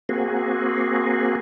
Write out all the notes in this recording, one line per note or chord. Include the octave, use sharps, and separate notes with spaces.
A#3 C4 F#4 G#4